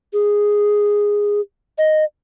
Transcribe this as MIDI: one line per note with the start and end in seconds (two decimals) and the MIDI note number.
0.13 1.41 68
1.78 2.04 75